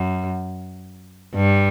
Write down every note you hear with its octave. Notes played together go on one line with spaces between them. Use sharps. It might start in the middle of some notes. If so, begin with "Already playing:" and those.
Already playing: F#2
G2